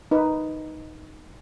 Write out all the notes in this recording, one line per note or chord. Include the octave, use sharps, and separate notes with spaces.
D#4 B4